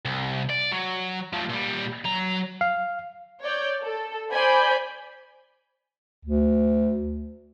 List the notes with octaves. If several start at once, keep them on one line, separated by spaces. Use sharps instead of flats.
C2
D5
F#3
F3 A3
A#2 G3
F#3 A#5
F5
C#5 D5 G6
A4
C5 D5 G#5 B5 G6
D2